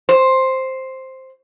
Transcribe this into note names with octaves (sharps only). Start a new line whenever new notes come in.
C5